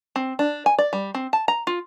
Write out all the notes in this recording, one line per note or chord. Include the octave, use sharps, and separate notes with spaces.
C4
D4
G#5
D5
G3
C4
A5
A#5
F4